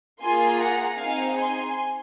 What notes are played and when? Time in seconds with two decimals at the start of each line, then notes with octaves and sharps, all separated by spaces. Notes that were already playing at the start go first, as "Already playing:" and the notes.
0.22 A#3 F4 G#4 G#5 C6
0.60 F#5 A#5
0.99 C4 D#4 G#4 F5 G#5
1.39 G#5 C6